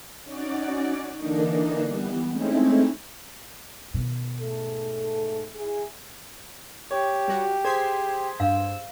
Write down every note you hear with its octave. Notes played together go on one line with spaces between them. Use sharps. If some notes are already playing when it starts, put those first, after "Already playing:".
C#4 D#4 F#4 D5
D3 E3 A#3 D4 D#4
E3 G3 B3
G#3 A3 C4 C#4 D#4 E4
B2 D#3
G#2 A3 A4
E4 G#4
G4 C#5
G3 F#4
G#4 C5 G#6 B6 C7
G2 F5 E6